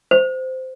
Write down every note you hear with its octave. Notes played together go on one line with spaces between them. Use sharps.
C5